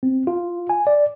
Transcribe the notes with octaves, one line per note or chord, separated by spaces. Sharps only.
C4
F4
G#5
D5